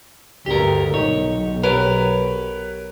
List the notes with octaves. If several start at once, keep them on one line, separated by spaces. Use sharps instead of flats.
D2 G2 G4 A#4
B1 D#4 C#5
G4 A#4 B4 C#5